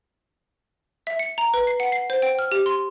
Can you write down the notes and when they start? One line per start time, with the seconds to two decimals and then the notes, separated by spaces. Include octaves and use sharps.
1.07 E5
1.19 C#7
1.38 A#5
1.54 B4
1.67 C7
1.80 F#5
1.92 C7
2.10 C5
2.22 G5
2.39 F6
2.52 G4
2.66 C6